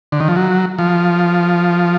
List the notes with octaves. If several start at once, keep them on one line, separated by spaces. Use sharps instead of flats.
D3
D#3
F3
F#3
F3